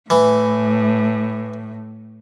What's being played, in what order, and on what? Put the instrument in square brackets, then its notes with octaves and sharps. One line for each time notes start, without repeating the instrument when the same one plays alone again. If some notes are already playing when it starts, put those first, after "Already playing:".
[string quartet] A2 [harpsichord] E3